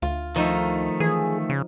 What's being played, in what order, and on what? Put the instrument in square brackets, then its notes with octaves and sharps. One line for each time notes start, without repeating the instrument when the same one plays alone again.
[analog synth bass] D2 [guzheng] F4
[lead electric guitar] D#3 A3 [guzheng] F3 D#4
[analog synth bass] E3 [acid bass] G#4
[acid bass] C#3